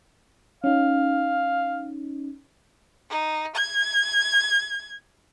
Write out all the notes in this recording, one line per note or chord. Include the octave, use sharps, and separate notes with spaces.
C#4 D#4 F5
D#4
G#6